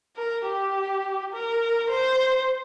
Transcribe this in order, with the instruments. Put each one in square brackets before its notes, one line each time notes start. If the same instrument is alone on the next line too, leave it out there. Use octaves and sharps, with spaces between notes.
[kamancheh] A#4
G4
A#4
C5